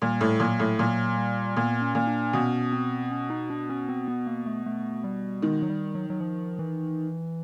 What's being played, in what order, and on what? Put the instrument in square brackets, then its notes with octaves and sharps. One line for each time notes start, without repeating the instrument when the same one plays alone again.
[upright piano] A#2 [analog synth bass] G3
[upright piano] A2
[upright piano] A#2 [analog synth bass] F#3
[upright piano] A2
[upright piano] A#2 [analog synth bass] F#3
[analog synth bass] G3
[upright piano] A#2 [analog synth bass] B3
[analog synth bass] C#4
[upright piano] A#2
[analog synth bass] D4
[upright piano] B2 [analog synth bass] C#4
[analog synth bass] C4
C#4
D#4
D4
C#4
C4
B3
A#3
A3
A3
G3
[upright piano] D#3 [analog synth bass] G#3
[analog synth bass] F#3
G3
F#3
F#3
F3
E3